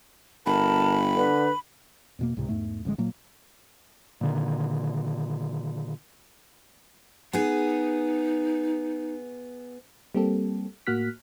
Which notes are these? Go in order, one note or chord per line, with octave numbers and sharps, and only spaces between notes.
G1 A#4 A5 B5
D3 B4
E2 B2 A#3
C#2 A2 C3
E2 G#2 A3
A1 D3 F#3 G#3
A#2 F#3 A#3
A#2 D3 D#3
B3 D#4 G#4
G3 A#3 C4 G4 A4
A2 A#3 F#4 F6 F#6 B6